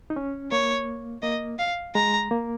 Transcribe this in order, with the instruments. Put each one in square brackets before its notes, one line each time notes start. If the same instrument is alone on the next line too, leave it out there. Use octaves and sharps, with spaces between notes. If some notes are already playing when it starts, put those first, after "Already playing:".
[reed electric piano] D#4
C#4
[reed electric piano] A#3 [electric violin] C#5
[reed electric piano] A#3 [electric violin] D#5
[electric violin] F5
[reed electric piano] G#3 [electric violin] A#5
[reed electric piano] A#3